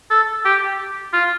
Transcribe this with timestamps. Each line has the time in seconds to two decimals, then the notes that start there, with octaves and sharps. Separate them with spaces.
0.11 A4
0.45 G4
1.13 F4